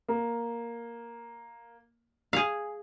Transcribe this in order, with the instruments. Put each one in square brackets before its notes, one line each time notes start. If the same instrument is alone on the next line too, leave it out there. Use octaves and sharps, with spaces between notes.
[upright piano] A#3
[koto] G#4 F5